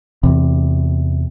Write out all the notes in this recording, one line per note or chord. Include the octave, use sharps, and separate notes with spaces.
E2 C3